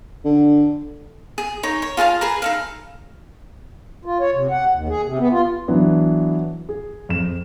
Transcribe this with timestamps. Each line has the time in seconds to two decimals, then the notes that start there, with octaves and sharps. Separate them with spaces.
0.25 D3
1.38 G#4
1.63 D#4 C#5
1.82 C#5
1.97 F4 G#4 F5 A5
2.21 G#4 B4 A#5
2.42 D#4 A4 F5
4.05 F4
4.20 C#5
4.34 C3
4.51 F#5
4.72 D#2
4.89 G#4
5.05 C3
5.19 B3
5.32 F4
5.68 E3 F#3 B3 D4
6.69 G#4
7.09 F2 E7